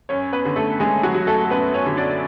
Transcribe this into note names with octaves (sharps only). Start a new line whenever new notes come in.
F#2 C#4 C#5
B3 B4
D3
A3 A4
F#2 G#3 G#4
F#3 F#4
F#3
A3 A4
A4
F#2 B3 B4
C#4 C#5
D3
D4 D5